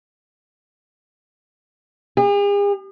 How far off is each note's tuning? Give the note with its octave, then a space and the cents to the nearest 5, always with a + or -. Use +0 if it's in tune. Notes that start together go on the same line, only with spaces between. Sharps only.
G#4 -45